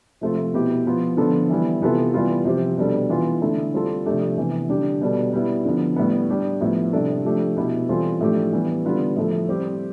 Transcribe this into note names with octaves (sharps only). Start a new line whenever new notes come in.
C3 F3 A3 C4 F4
B2 B3 E4 G4
F3 B3 F4
D3 F3 B3 F4 A4
E3 G3 B3 E4
C3 E3 B3 F4 A4
E3 G3 B3 F4
C3 F3 C4 G4
B2 G3 D4 A4
E3 B3 F4
D3 A3 E4 A4
G3 C4 F4 A4
C3 F3 A3 D4 G4
C3 E3 B3
D3 G3 D4 G4
B2 G3 D4 A4
G3 B3 E4
D3 F3 B3
A2 G3 B3
G3 D4 G4
A2 F3 B3 E4
C3 G3 D4 A4
F3 A3 D4 G4
B2 B3 E4 G4
E3 G3 C4 F4 A4
A2 F3 A3 D4 G4
E3 G3 B3
D3 G3 B3 F4
A2 F3 A3 E4 A4
G3 C4 G4